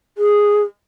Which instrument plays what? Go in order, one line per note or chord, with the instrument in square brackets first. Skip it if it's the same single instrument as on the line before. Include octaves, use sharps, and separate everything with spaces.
[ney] G#4